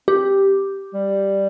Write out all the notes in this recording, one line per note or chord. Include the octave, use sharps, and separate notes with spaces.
C4 G4
G3